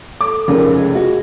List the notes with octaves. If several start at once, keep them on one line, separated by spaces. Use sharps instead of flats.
A4 D6
F1 C#2 C#3 D#4 G#4 A#4
G#4 D#5
F#4